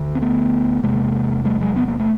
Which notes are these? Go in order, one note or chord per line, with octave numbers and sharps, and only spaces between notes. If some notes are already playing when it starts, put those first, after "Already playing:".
Already playing: D2 D3
C4
A3 B3
E2 C3 G#3 A#3
G3 A3
F#3 G#3
B3
A#3
A3